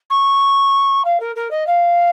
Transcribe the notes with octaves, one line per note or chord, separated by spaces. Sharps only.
C#6
F5
A#4
A#4
D#5
F5